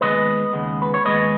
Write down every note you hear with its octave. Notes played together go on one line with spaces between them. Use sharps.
D#2 C#3 G#3 B3 B4 D#5
D#2 C#3 G#3 B3
B4
C#5
D#2 C#3 G#3 B3 B4 D#5